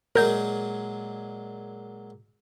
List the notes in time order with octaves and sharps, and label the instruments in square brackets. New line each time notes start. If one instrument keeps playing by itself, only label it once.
[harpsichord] A#2 F#3 G#3 [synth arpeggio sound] A#4 G6